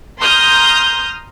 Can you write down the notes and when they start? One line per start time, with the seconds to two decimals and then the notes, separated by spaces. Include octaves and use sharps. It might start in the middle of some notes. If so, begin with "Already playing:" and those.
0.21 A#5 C6 D#6 F6 G6